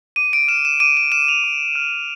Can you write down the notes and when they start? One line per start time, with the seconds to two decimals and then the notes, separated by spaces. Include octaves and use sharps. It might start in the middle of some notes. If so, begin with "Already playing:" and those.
0.16 D6 D#7
0.33 D7
0.48 F6 E7
0.65 E7
0.80 D6 D#7
0.97 E7
1.12 F6 E7
1.28 F7
1.44 D6
1.75 F6